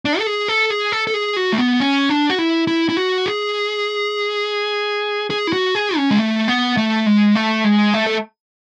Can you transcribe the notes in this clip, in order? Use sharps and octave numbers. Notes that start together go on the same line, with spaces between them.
D4
A4
G#4
A4
G#4
A4
A4
G#4
F#4
A3
B3
C#4
D4
F#4
E4
E4
E4
F#4
G#4
G#4
E4
F#4
G#4
C#4
G#3
A3
B3
A3
G#3
A3
G#3
A3
A4